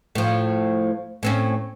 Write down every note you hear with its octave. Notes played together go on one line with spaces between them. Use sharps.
A2 F3
A2 C4 C#4